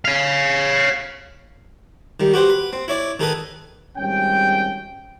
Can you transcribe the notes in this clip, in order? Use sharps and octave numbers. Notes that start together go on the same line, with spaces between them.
C#5 F5
D#3 G3
F#4 G4 B4 C5
B4
C4
E4 C#5 D5
D#3 G#4 A4 B4 D#6
G#1 G3 G#3 C#4 G5